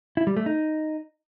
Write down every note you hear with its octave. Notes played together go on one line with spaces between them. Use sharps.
E4
G3
A3
D#4